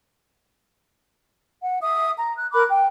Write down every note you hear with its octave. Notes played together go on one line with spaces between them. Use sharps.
F#5
E5 D#6
A#5
F#6
A#4 B5 D6 F#6
G5